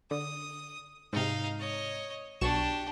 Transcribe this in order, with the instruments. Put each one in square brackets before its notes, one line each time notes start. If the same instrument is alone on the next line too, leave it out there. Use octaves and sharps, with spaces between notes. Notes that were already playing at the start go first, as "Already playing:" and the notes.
[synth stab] D3 [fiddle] D#6
[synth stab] G#2 C3 [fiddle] D#4 F5
[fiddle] C#5 D#5
[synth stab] B1 C#6 E7 [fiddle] D4 G4